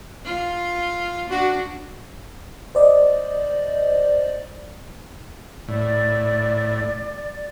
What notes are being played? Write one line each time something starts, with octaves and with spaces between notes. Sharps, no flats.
F4
D4 F#4
C5 D5 D#5
A2 D5